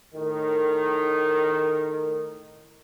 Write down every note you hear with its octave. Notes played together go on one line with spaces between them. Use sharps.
A2 D#3